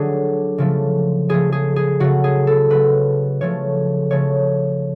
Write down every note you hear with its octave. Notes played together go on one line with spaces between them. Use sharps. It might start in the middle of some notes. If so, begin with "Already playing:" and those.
Already playing: D3 F#3 A3 D4 G#4
C#3 F3 A3
C#3 F3 A3 G#4
G#4
G#4
C#3 F#3 A3 F#4
G#4
A4
C#3 F#3 A3 B4
C#3 F3 A3 C#5
C#3 F3 A3 C#5